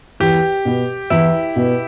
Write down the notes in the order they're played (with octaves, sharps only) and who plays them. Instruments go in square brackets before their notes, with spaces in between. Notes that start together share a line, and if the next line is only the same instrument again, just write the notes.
[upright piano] E2 [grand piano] G4
[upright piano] B2 B3
[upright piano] E2 [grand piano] E4
[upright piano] B2 B3